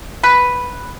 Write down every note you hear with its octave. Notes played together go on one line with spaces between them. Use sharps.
B4